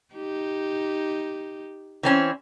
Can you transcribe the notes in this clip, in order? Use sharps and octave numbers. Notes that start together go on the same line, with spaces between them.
D#4 G4
E3 C4 C#4